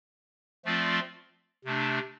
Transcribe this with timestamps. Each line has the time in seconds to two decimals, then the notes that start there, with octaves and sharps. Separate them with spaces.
0.65 F3 A3 C4 F4 D5
1.65 C3 A3 D4